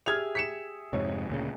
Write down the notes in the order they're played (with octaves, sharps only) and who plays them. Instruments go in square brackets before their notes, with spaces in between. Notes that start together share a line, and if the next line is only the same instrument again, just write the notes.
[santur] G4 G#4 E5 [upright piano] F6 G#6 F7
[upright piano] B6 C#7 E7
[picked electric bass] F2 G#2 C3 [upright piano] C#5
[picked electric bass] D2 A#2 C#3